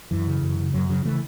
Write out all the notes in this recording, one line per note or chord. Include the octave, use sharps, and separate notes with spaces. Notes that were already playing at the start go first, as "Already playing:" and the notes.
F#2 E3
C#3
F#2
C#3
F#2 F#3
C#3 F#3
C#3 E3 A3